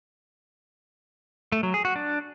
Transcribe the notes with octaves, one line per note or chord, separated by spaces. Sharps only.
A3
F#3
G#4
F#4
D4